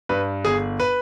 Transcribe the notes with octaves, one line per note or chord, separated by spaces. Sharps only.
G2 B4
G1 G#4
B4